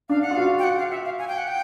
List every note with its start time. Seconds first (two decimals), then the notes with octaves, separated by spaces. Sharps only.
0.09 D4 F5
0.22 F#5
0.31 F4
0.35 F#4 F5
0.59 G5
0.64 F#5
0.78 F5
0.91 E5
1.05 F5
1.19 G#5
1.28 G5
1.38 F#5
1.47 G5